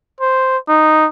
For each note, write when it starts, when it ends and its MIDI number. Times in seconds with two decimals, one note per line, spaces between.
0.20 0.57 72
0.68 1.07 63